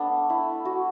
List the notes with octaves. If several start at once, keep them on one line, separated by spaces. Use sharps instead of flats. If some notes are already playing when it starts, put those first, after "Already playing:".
Already playing: A3 B3 D4
E4
F#4